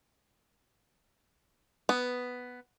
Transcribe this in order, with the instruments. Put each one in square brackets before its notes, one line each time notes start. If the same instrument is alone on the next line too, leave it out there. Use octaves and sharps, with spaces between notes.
[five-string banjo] B3